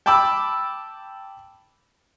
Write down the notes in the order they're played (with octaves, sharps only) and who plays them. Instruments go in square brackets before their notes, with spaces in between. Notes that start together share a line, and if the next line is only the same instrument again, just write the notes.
[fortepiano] G5 A5 B5 D6 E6